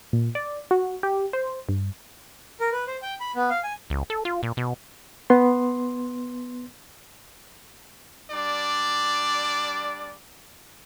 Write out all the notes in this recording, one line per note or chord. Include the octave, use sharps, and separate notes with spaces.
A#2
D5
F#4
G4
C5
G2
A#4
B4
C5
G5
B5
B3
F5
G#5
C#2
A4
F4
A#2
B2
B3 C6
G3 D4 D5